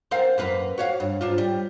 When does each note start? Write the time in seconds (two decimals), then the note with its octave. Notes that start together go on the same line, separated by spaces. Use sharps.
0.11 C4 A#4 F5
0.38 F#2 A#3 B4
0.78 F#4 C#5 F5
1.00 G2
1.21 G#2 D4 F4
1.38 G3